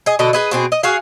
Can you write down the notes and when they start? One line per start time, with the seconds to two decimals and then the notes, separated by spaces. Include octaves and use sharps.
0.06 G#4 D#5
0.19 B2 D3 A4 D#5
0.33 G#4 B4 D#5
0.51 B2 C4 G#4
0.72 D#5
0.83 F#4 G#4 F5